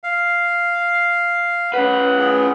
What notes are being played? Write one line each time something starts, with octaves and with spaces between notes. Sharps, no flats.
F5
C#4 B4 F#5
G#4